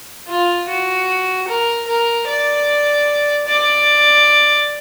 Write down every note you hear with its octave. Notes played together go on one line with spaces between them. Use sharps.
F4
F#4
A#4
A#4
D5
D5